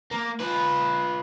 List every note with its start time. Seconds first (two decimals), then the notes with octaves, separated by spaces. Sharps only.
0.11 A#3
0.40 F4 B4